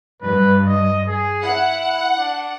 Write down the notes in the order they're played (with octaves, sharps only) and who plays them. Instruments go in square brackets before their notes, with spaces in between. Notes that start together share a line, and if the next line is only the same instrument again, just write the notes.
[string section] G2 [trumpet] B4
[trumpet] D#5
G#4
[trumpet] E4 [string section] F#5
[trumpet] D4